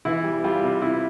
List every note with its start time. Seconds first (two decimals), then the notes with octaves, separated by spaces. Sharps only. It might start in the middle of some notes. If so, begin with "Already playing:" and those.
0.05 E3 E4
0.24 G3
0.44 G3 F4
0.63 C3
0.82 C3 E4